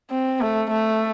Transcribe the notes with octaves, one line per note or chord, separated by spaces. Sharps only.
C4
A3
A3